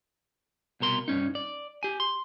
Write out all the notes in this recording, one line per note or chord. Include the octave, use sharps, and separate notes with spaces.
C2 B2 A#4 C6
G2 C#4 D#4
D5
G4 G#5
C6